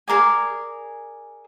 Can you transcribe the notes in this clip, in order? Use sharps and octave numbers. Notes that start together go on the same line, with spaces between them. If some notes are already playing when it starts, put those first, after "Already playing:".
G#4 A#4 D5 G#5